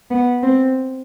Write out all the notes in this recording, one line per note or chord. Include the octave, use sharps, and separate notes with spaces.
B3
C4